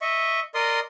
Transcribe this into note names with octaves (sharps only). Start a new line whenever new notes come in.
D#5 E5 C#6
A#4 D5 D#5 C6 D#6